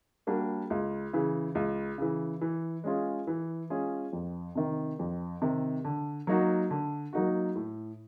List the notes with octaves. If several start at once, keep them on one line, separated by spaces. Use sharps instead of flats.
G3 A#3 D4 F#4
C#2
C#3 E3
C#2
C#3 E3
E3
G#3 C#4 F4 G#4
E3
G#3 C#4 F4 G#4
F2
C3 D#3
F2
C3 D#3
D3
F#3 A#3 D#4 F#4
D3
F#3 A#3 D#4 F#4
A2